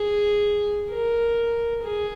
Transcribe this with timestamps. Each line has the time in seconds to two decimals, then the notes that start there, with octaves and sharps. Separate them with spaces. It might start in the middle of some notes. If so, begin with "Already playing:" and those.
Already playing: G#4
0.90 A#4
1.82 G#4